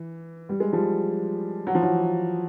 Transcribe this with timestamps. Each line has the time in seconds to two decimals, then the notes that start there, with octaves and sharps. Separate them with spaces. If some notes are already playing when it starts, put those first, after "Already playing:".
Already playing: E3
0.49 G3
0.60 G#3
0.73 F3 G3
1.67 F#3
1.75 F3
1.82 E3 F#3